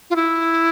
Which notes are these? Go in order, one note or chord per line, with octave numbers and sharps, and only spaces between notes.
F4
E4